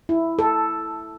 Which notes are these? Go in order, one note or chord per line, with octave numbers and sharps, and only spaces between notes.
E4
A4